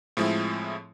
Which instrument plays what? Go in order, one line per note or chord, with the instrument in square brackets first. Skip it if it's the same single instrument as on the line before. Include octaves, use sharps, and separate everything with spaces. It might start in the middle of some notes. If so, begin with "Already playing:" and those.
[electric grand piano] A2 F3 G#3 C4 E4